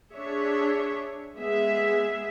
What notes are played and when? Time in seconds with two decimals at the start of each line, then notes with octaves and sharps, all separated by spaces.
0.13 D4 G#4 C#5 E5
1.37 G#3 B3 G#4 E5